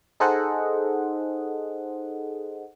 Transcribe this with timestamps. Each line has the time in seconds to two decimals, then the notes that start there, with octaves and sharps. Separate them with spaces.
0.20 D#4 G#4 A4 C5 D#5 F#5